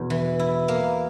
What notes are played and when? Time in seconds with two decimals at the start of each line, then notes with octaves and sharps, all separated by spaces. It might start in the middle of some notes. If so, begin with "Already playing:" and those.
Already playing: E2 B2
0.10 E3
0.39 E4
0.68 A#3